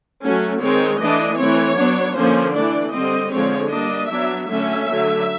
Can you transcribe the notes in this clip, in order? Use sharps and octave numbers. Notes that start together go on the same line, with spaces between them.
F#3 A3 C#4
D#3 G#3 C4 C#5
E3 A3 D4 D#5
E3 A3 C4 C#5
F#3 B3 D4
D3 F3 A#3 C#4 C5
E3 A3 D4 D5
D3 G3 C4 D#5
D3 F3 G#3 C4 C#5
G3 A#3 D4 D#5
F#3 B3 D4 E5
D3 F#3 A3 C#4 E5
D3 F#3 A3